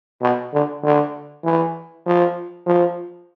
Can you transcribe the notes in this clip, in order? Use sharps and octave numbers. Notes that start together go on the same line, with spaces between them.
B2
D3
D3
E3
F3
F3